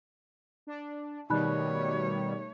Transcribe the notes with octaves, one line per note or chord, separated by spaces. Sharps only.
D4
B2 D#3 G3 A3 D#4 C#5 B5 F#6